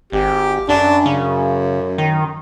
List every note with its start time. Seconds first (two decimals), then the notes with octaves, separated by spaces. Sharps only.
0.12 G#1 G4
0.69 F#2 D4
1.06 F#2 C#3
1.98 D#3